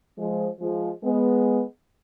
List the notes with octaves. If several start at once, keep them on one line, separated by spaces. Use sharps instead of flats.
F3 G#3
F3 G#3
G#3 B3